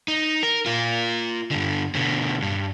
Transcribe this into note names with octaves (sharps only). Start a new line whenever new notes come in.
D#4
A#4
F4 A#4
G2 D3
B2 D3
G2